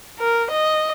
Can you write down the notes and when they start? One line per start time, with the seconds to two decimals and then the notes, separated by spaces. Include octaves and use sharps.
0.19 A#4
0.51 D#5